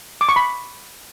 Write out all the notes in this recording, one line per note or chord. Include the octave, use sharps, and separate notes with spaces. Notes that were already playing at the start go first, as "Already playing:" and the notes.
D6
C#6
B5